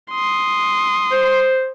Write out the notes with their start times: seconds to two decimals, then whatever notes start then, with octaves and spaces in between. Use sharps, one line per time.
0.12 C6 D#6
1.12 C5